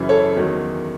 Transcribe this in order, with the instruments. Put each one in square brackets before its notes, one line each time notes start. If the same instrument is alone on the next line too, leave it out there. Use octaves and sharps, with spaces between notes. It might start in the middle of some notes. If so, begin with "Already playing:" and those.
Already playing: [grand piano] F#2 C#3 E3
A4 C#5
E2 D#3 F#3